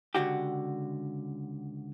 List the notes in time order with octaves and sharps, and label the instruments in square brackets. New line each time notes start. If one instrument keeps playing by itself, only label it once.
[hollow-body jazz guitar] C#2 G#2 D3 F#4 G4